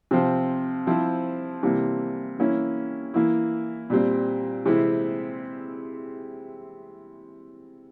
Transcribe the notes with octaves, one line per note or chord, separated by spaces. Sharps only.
C3 F3 C4
F3 C4 E4
C3 E3 G3 A#3
E3 A#3 C#4 E4
E3 A#3 E4
A#2 G3 C4
C3 E3 G#3 C4 E4